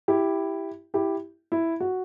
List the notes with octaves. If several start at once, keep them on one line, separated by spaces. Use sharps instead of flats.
E4 G4
E4 G4
E4
F#4